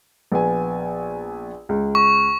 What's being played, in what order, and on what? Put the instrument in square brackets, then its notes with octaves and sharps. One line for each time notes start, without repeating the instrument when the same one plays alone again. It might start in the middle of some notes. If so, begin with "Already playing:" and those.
[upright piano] A#1 B3 G#5
C#2
[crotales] C#6